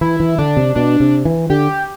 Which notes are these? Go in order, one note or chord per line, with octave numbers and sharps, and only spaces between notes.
E3 E4
E3
D3 D4
C3
B2 D4
C3
E3
D3 G4